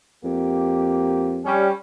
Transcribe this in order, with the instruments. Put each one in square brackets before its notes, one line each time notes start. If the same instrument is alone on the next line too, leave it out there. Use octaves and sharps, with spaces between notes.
[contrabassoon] F2 [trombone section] A#3 G4
[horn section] G3 C#4